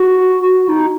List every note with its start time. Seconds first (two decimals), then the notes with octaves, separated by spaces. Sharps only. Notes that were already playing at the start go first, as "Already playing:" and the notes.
Already playing: F#4
0.69 D#4